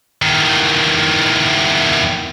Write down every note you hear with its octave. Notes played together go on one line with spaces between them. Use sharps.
E2 D#3